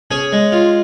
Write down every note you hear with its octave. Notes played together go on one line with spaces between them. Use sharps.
C#4 G#4 G#5
G#3
F4